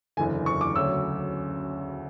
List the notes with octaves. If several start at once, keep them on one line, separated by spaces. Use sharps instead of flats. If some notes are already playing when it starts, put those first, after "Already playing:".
F#1 E2 D3 G#5
C#6
D6
D2 C#3 F#3 E6